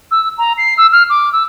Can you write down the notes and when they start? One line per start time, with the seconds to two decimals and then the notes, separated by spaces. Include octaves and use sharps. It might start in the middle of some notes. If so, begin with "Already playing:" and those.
0.11 E6
0.38 A#5
0.58 C7
0.78 E6
0.92 F6
1.10 D6
1.33 E6